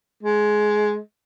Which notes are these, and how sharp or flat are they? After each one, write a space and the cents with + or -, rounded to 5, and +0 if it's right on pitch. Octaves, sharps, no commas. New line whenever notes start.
G#3 +15